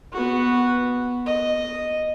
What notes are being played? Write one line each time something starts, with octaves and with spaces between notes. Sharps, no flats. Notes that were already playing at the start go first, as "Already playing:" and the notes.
B3 F#4
D#5